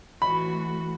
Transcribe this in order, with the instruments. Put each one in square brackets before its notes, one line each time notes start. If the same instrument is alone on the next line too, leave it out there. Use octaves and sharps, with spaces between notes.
[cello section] E3 A3 F#4 [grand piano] B5